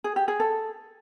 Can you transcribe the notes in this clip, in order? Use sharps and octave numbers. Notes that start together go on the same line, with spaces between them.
G#4
G4
G#4
A4